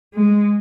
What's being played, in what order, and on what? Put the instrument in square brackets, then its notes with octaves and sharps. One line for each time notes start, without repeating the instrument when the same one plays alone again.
[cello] G#3